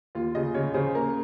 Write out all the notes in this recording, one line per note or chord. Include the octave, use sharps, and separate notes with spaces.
D#2 F4
C#3 D#5
C#3 C#5
C#3 C5
A#3 A#4